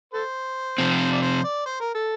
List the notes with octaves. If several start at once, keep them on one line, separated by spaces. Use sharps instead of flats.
A4 C5
C3 F3 C4
D5
C5
D5
C5
A#4
A4